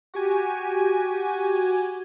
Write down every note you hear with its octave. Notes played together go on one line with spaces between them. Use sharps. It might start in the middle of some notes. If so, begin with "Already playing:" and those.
F#4 G4 G#5